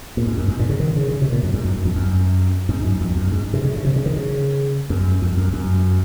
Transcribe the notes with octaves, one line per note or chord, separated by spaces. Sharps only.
A#2
G#2
F#2
G#2
A#2
C#3
D#3
C#3
C#3
C3
A#2
F#2
G#2
F#2
F2
F#2
G#2
F#2
F2
F#2
G#2
C3
C#3
C#3
C3
C#3
D#3
C#3
F#2
F2
F#2
F#2